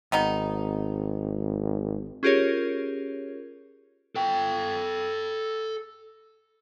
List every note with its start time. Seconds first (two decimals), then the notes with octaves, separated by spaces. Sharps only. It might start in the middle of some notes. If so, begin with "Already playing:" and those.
0.12 G#1 D#3 B3 D#4
2.23 C#4 F4 G4 G#4 A#4 C#5
4.16 A4 G5